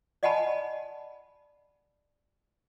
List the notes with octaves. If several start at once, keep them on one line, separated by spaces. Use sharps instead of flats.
D5 D#5 F#5 G#5 A5 B5